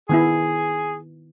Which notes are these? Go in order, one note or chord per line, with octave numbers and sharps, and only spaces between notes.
D#3 B3 E4 G#4